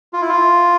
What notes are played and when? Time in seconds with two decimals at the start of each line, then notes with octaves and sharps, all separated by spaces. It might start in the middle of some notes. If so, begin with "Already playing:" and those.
0.13 F4
0.21 E4
0.29 F4